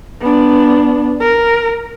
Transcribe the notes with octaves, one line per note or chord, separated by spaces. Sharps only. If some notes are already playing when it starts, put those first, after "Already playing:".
B3 D4
A#4